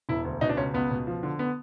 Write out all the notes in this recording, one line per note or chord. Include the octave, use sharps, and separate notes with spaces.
E1 E4
D2
B2 D#4
D4
C#2 C#4
C#2 B3
B2
F3
D3
B3